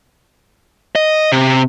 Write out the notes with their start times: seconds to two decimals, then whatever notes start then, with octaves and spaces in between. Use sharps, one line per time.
0.95 D#5
1.32 C3